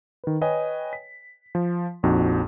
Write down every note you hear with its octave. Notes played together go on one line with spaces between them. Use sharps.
D#3 B4
B4 C#5 D#5 G5 G#5
B6
F3
A#1 F2 D#4 F#4